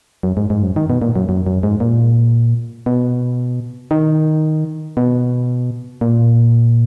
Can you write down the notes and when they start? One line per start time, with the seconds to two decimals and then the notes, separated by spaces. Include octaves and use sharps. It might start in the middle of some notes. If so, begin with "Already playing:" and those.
0.23 F#2
0.37 G#2
0.50 G#2
0.62 F#2
0.76 D#3
0.90 B2
1.02 A#2
1.16 F#2
1.29 F#2
1.47 F#2
1.63 G#2
1.80 A#2
2.86 B2
3.91 D#3
4.97 B2
6.01 A#2